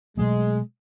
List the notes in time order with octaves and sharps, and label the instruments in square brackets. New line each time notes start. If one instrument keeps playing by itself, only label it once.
[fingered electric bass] B2 F#3 A3 [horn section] G#3